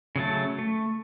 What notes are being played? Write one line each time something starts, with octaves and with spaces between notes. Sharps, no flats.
C#3 F#3 A3 A5
A3